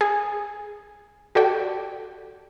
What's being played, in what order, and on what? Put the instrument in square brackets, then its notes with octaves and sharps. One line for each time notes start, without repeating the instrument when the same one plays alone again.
[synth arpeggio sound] G#4
F#4 G4 A4 D5 G5